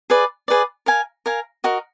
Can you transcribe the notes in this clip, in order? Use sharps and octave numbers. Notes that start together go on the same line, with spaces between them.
G#4 B4 D5
G#4 B4 D5
A#4 F5 G#5
A#4 F5 G#5
F#4 A#4 D#5